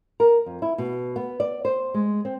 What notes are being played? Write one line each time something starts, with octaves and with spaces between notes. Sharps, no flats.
A#4
F2
E4
B2
B3
D5
C5
G#3
C4